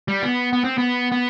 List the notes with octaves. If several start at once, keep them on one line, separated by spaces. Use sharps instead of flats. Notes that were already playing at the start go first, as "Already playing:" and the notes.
G3
B3
B3
C4
B3
B3